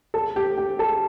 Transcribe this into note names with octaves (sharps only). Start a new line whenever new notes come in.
A4
G4
G4
A4